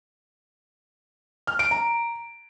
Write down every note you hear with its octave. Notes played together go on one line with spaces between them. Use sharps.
F6
D7
A#5